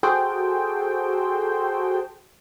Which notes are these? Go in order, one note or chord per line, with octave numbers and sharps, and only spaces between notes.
F#4 G#4 A4 C5 G5